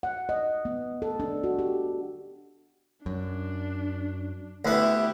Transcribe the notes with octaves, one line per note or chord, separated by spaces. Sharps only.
F#5
D#5
B3
A4
D4
F#4
G4
F#2 D4
D2 B3 E4 G4